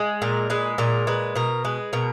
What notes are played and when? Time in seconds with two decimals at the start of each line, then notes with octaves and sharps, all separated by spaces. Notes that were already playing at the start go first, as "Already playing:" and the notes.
Already playing: G#3
0.22 A#2 A#4
0.50 G#3 B4
0.78 A#2 A#4
1.07 G#3 B4
1.35 B2 A#4
1.65 G#3 B4
1.93 B2 A#4